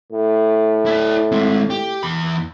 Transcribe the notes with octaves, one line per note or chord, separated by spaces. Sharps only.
A2
E4 D5
G#3 C4
G4
E2 B5